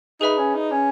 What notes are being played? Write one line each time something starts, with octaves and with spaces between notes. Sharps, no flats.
D#4 G#4 B4 E5 B5
C#4
D#4
C#4